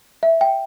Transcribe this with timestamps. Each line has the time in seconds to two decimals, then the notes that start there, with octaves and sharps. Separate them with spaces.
0.23 E5
0.41 G5